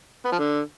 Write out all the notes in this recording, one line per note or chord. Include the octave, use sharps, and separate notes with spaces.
B3
F3
D3